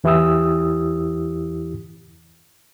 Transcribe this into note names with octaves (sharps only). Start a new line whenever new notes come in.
E2 E3 E4 G4 D#6 E6